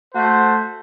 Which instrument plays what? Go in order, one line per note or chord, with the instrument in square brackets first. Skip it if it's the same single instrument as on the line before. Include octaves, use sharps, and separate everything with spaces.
[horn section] A3 F#4 C5